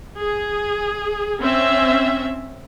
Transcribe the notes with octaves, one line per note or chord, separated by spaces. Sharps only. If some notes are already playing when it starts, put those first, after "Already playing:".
G#4
C4 C#4 E5